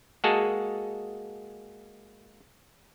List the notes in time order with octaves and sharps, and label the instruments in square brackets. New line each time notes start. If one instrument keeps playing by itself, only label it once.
[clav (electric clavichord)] G#3 A#3 F#4 G#4 A4 A5